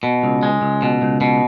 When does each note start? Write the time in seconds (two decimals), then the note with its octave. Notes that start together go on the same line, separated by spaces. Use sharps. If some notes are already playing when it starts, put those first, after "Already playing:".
0.03 B2
0.24 C#2
0.43 G#3
0.62 C#2
0.82 B2
1.02 C#2
1.21 B2